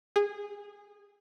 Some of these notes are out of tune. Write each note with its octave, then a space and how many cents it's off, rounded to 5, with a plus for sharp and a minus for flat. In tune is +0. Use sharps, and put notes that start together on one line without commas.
G#4 -20